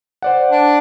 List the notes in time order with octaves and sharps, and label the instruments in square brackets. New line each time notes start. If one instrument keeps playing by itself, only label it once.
[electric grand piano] C5 D5 F#5
[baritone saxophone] D4